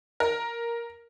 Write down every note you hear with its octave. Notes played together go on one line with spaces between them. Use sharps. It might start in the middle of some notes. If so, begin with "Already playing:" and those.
A#4